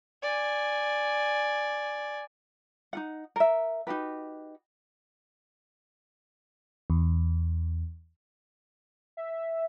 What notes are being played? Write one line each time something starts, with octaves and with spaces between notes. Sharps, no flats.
D5 G#5
D#4 F4 F#5
A#4 E5
D#4 F#4 G4 B4
E2
E5